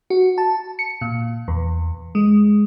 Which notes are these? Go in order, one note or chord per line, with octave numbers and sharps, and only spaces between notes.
F#4
A5
C#7
A#2
E2
G#3